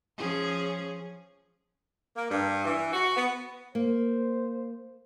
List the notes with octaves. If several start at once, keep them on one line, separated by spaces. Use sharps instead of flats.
F3 C#4 G#4
A#3
G2
E3
F#4
B3
A#3 C5